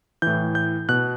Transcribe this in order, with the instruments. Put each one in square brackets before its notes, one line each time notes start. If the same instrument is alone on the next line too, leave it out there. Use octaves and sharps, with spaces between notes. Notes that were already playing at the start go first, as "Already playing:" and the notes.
[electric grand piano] A2 E3 G6
G6
B2 F#6